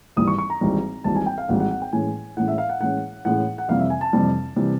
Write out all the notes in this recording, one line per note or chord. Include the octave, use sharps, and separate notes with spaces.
G#1 G#2 E3 G3 D#6
C#6
C#6
A#5
G#1 G#2 E3 G3
G#1 G#2 E3 G3 A5
G#5
G5
F5
G#1 G#2 E3 G3 F#5
F#5
F#5
G5
A2 E3 G#3 C#4 G#5
A2 E3 G#3 C#4 F#5
E5
F5
F#5
A2 E3 G#3 C#4 F#5
A2 E3 G#3 C#4 F#5
F#5
F2 C3 E3 G3 F5
E5
G#5
A5
F2 C3 E3 G3
C3 E3 G3